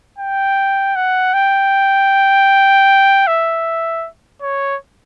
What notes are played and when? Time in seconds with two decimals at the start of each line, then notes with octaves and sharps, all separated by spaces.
0.18 G5
0.96 F#5
1.33 G5
3.27 E5
4.42 C#5